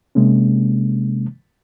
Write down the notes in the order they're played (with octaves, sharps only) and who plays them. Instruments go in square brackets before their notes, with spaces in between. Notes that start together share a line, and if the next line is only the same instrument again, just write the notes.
[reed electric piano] C3 G#3 A#3 C#4